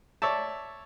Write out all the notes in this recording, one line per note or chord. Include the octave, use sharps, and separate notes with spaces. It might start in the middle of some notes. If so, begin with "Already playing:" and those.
C#5 D5 E5 A5